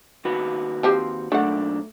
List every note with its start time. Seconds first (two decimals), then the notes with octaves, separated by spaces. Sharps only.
0.25 D#2 F#4 B4
0.83 F3 C4 G4
1.32 B1 A3 D4 F#5